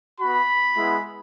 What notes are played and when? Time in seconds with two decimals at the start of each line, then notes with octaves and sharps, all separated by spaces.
0.20 B3 F#4 B5
0.76 G#3 B3 E4